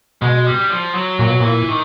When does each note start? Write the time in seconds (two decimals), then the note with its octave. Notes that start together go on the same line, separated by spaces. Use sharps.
0.22 B2 G#3
0.46 G3
0.70 F3
0.94 F#3
1.19 A#2 F#3
1.30 B2
1.40 A#2 E3
1.68 D#3